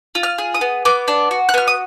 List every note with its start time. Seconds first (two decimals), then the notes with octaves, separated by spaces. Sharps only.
0.15 F4
0.23 F6
0.38 G#4
0.54 D#6
0.61 B3
0.85 B3 D6
1.08 D4
1.31 F#4
1.49 F#6
1.54 B3 F6
1.68 D#6